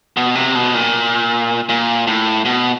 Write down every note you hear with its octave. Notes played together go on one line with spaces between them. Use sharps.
B2
C3
B2
A#2
A#2
A2
B2